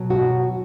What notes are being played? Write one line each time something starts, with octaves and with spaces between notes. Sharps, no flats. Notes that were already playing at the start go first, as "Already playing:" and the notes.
Already playing: B2 F#3 B3
F#4